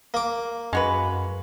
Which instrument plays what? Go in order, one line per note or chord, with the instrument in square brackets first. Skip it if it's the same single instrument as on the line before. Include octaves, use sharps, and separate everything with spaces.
[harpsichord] A#3 D6
[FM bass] F#2 [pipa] G#3 F#4 B4